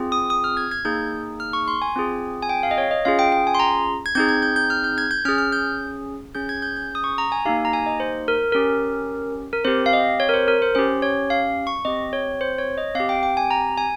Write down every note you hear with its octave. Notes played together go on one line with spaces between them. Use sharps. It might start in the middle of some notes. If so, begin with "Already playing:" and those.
Already playing: C4 F4 G#4
D#6
D#6
F6
G#6
G#6
A#3 D#4 G#4 G6
F6
C#6
C6
G#5
C4 F4 G#4
G#5
G5
F5
D#5
C#5
D#5
C#4 F4 G#4 F5
G5
G5
G#5
C6
A#5
G#6
C4 D#4 G#4 G6
G#6
G6
G6
F6
G6
G#6
G6
C#4 G#4 F6
F6
G6
C#4 G#4 G6
G#6
G6
G6
D#6
C#6
A#5
G#5
A#3 D#4 G4 F5
A#5
G#5
D#5
C5
A#4
C#4 G4 A#4
A#4
C4 G4 C5
F5
D#5
C#5
A#4
C5
A#4
C5
C#4 G4 C5
C#5
F5
C#6
C4 G4 D#5
C#5
C5
C#5
D#5
C4 F5
G4
G5
G5
G#5
A#5
G#5